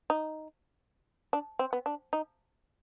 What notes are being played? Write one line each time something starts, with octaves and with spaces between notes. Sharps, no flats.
D#4
D4
C4
B3
D4
D#4